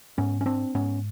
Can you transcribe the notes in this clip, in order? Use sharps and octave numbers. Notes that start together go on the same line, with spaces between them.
G#2 B3 C#4
C#4
C4 D4
G#2 B3 C#4